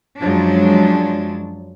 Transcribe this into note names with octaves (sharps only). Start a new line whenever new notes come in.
F#2 F3 F#3 G#3 D4